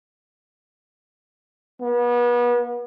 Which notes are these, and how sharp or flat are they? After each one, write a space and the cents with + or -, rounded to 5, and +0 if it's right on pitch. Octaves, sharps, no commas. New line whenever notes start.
B3 -35